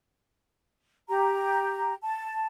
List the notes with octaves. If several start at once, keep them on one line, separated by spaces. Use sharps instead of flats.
G4 A#5
A5